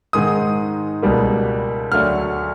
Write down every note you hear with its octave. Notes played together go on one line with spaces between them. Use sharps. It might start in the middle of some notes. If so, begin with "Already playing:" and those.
G#2 D#3 G#3 D#6
C#2 B2 G3 A#3
D2 D3 F#3 A3 D4 F6